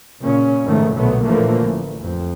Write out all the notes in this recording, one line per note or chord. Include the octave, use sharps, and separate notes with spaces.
A#2 C#3 C#4
F2 G#2 B2 D#3 A3
B1 A#2 D3 F#3 A3 B3
A#2 D3 E3 F3 A3 A#3
A1
F2